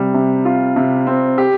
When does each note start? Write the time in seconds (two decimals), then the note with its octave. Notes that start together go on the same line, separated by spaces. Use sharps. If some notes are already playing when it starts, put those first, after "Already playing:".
Already playing: C3 G3
0.14 C3
0.45 F4
0.76 C3
1.07 C4
1.38 G4